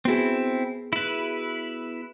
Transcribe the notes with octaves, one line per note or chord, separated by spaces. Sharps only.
B3 C4 E4 F#4 G#4
E4 B4